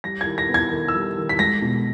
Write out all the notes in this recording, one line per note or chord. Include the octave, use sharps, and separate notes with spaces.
G3 A#6
G#6
D#3
A#6
B3
G#6
D#3
E6
G3
D#3
B6
G#3 A#6
B2